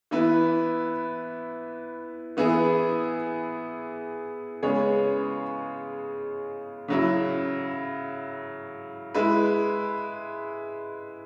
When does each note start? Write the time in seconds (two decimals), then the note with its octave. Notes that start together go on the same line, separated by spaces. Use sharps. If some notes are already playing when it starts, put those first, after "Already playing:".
0.11 E3 B3 E4 B4
2.37 E3 B3 E4 G#4
4.63 C#3 G#3 B3 G#4 C#5
6.88 C#3 F#3 E4
9.14 G#3 E4 B4